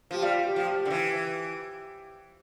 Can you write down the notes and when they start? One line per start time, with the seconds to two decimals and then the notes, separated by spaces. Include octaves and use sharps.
0.11 F3 G4
0.22 G3 F4
0.46 G4
0.56 F3
0.68 G4
0.85 D3
0.90 E3